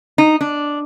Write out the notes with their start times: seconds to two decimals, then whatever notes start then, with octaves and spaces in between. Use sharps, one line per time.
0.18 D#4
0.41 D4